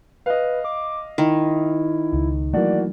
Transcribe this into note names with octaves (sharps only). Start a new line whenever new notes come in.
B4 D#5 F5
D6
D#3 E4
C#2
E3 F#3 A3 A#3 F#4 D5